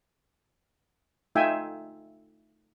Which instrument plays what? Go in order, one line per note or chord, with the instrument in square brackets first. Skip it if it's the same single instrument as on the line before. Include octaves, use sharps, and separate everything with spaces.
[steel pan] A3 D#4 F4 E5 G5 G#5